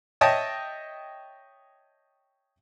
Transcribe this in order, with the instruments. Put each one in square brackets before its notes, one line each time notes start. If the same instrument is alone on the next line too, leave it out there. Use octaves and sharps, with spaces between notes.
[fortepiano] C#5 D#5 E5 G5 A5 D#6